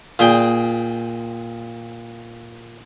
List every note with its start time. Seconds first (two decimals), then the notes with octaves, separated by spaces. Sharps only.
0.19 A#2 G#4 G5